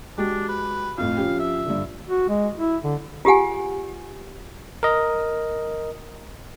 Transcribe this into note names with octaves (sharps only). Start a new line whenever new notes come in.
G#3 D4 F#4 G4
B4
F2 A2 F5
F3 C#4 G4
E5
G2 D3
F#4
G#3
E4
D3
F4 G4 G#4 F#5 G#5
A#4 D#5